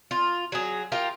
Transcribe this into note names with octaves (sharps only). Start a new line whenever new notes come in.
F4
F#3 G#4
F4 G4 A#4